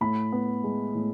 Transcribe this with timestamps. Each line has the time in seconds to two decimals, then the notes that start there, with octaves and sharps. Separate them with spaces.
0.01 A2 B5
0.32 B3
0.63 G#3
0.95 A2